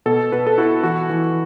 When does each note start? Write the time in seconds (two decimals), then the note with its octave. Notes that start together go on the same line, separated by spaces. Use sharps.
0.06 B2 A4
0.32 B2 B4
0.47 A4
0.58 E4 F#4
0.83 E3 F#4
1.10 E3